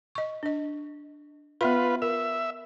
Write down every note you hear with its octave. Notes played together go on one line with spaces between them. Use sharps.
D#5 C#6
D4 D#5
B3 F4 B4 E5 C6
A#4 E5